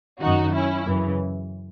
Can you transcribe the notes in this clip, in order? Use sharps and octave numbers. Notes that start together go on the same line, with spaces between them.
F#2 D#3 D#4 F#4
C#4 E4
F#2 C#3 E3